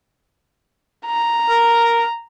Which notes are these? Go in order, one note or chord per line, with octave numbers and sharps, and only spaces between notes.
A#5
A#4